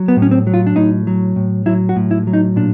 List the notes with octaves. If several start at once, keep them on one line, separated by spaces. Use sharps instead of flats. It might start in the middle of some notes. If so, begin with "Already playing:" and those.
Already playing: F#3
B3
A2
C#4
C4
F#3
F4
D4
A2 D#4
F#3
A2
F#3 E4
F#4
A2
E4
F#3
D#4
A#2 D4